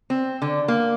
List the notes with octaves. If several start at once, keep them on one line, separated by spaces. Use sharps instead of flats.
C4
D3
A#3